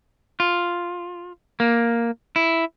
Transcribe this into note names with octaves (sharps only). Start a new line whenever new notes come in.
F4
A#3
E4